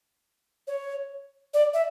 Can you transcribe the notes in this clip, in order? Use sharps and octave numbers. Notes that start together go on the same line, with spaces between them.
C#5
D5
E5